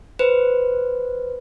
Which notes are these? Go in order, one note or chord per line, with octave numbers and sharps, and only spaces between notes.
B4 C5